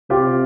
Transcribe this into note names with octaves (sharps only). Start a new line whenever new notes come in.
C3 F4 G4